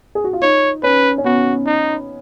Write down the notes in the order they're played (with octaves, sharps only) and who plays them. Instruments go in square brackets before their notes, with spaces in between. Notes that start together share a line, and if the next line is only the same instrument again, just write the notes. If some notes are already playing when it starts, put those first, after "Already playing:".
[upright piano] G#4
F#4
F4
[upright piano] D#4 [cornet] C#5
[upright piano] C#4 [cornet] B4
[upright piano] C#4
[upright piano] B3 [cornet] F#4
[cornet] D#4